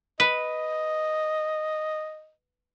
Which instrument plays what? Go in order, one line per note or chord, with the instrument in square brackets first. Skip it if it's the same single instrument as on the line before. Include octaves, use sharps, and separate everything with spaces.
[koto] B4 [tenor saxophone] D#5